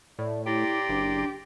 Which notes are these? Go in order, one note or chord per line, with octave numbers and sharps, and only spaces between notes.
A2 D5
E4 G4 D5 A#5 C6
F#1 D4